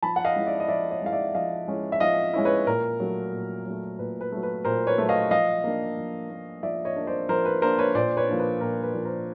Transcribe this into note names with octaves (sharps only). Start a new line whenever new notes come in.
F3 A5 B5
F#5
D#5 F5
G#3 C#4 E4
D5 E5
D#5
F3 D5 E5
C#5 D#5
G#3 C#4 E4 F5
D5 E5
F3 D#5 F5
G#3 C#4 E4
E5
F3 D#5 F5
G#3 C#4 E4
B4 C#5
A#2 A#4
F#3 A3
A#2
F#3 A3
A#2 B4
B4
F#3 A3
B4
A#2 A#4 C5
B4 C#5
F#3 A3
D#5 F5
F3 D#5 F5
A#3 D4
F3
A#3 D4
F3 D5 E5
C#5 D#5
A#3 D4
C5 D5
F3 A#4 C5
B4
A#3 D4 A#4 C5
B4 C#5
A#2 C5 D5
B4 C#5
F3 A#3 D4
B4
A#2 A#4
B4
F3 A#3 D4
A#4 C5